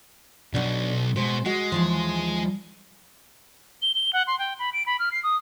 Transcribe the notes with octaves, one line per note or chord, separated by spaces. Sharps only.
B1 B2 B3 D4
B2 G#3 C5
G#3 F#4 D#5
D#2 E3 F3
G7
G7
F#5
C6
G5
B5
D7
B5
F6
C7
D#6